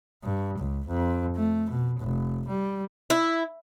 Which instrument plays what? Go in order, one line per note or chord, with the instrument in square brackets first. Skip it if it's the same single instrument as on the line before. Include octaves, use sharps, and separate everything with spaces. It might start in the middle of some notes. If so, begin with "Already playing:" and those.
[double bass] G2
C#2
F2
A3
B2
F1
G3
[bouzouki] E4